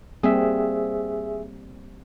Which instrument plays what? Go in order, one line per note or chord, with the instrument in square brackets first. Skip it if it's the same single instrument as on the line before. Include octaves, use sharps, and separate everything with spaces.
[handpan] G3 A#3 C4 [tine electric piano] G#4 E5